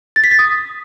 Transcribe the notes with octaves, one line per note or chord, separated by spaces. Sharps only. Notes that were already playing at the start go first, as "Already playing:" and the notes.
A6
B6
A6
D#6